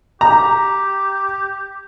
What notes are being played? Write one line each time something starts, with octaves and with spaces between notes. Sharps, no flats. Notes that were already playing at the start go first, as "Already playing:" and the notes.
G4 A#5